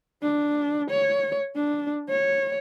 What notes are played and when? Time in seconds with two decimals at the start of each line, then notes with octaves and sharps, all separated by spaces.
0.22 D4
0.91 C#5
1.56 D4
2.09 C#5